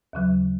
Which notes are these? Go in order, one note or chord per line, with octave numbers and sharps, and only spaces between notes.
D#2 C#3 F#3